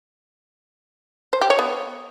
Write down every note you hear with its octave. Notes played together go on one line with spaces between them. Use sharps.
C5
G4
C#5
B3